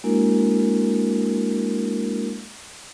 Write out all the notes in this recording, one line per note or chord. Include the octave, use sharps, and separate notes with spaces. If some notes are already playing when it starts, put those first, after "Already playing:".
G#3 A#3 D4 E4 F#4 A#4